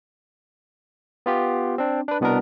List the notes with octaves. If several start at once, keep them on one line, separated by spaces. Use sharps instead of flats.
B3 F4 G4
C4 D4
D4 B4
C2 B2 B3 D4 A#4